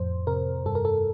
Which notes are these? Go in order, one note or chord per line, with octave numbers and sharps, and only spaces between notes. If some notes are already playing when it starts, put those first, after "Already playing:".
Already playing: F2 A2 C5
C3 A#4
G2 A4
A#4
A4